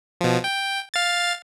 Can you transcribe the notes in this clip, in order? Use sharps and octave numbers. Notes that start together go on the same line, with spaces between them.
B2 F3
G5
F5 A6